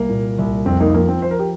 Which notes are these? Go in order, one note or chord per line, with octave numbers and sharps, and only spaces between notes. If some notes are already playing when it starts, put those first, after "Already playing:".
Already playing: C2 A#3
A#2
C2
F2 C4
A#3 D#4
F3 A#3
C4
F3 C5
A#4
G4